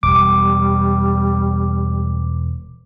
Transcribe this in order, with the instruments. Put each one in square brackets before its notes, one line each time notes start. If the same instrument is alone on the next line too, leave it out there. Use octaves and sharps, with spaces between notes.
[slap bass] E1 [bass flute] G3 [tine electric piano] D6